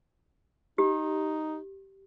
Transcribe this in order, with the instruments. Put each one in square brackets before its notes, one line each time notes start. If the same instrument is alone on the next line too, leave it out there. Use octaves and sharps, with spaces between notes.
[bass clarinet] D#4 [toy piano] G4